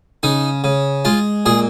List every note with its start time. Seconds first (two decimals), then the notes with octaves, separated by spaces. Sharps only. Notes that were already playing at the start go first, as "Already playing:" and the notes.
0.23 C#3 D#4
0.64 C#3
1.05 G#3 F4
1.46 A#2 G#4